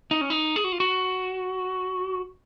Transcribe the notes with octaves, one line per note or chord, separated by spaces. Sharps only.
D#4
C#4
D#4
G#4
F#4
F4
F#4